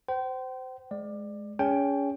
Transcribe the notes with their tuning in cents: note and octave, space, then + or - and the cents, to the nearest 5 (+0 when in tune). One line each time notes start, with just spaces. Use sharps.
C5 -20 G5 -40
G#3 +15 D5 +20
C#4 +30 G#4 -15 G5 +10